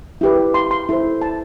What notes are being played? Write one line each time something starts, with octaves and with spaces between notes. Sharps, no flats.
E4 G4 B4
C6
C6
E4 A4 C5
A5